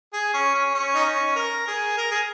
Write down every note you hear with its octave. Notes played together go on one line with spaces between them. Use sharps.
G#4
C#4
C#4
C#4
D#4
C#4
A#4
G#4
A#4
G#4